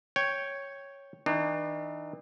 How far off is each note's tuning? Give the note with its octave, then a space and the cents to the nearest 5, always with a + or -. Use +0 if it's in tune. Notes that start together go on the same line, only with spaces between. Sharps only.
C#5 +0 G5 +0
E3 -45 D4 +40